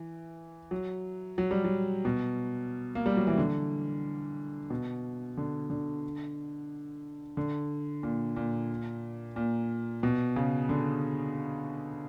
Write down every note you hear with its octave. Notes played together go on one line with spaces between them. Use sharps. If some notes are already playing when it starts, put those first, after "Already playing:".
Already playing: E3
F#3
F#3
G3
F#3
B2
A#3
G3
F#3
E3
D3
B2
D3
D3
D3
A#2
A#2
A#2
B2
C#3
D3